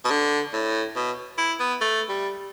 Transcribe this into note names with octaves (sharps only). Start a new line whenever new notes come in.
B2
D3
A2
B2
E4
B3
A3
G3